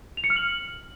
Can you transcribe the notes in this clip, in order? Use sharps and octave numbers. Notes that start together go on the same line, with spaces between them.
F7
C#7
F6
F#7